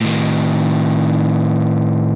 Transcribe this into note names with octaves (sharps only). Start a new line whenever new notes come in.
A2 D#3